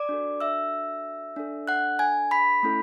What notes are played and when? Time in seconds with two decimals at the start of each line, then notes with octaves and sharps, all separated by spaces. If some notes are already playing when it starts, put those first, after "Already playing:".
Already playing: D5 D6
0.09 D4 F#4 A4
0.41 E5 E6
1.36 D4 A4
1.68 F#5 F#6
1.99 G#5 G#6
2.31 B5 B6
2.63 A3 C#4 E4 A4